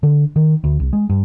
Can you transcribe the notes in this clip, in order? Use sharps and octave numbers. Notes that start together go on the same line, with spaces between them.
D3
D#3
D2
C2
G#3
G2